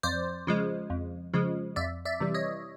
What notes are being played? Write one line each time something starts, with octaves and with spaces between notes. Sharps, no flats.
F2 C5 D5
C#3 F3 G#3
F2
C#3 F3 G#3
F2 D5 E5
D5 E5
C3 E3 G3
C#5 D#5